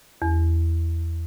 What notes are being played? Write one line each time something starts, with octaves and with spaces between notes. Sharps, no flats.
E2